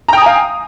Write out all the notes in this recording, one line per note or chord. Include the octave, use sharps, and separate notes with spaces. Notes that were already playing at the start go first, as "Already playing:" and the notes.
F5 G5 G#5 A#5 D#6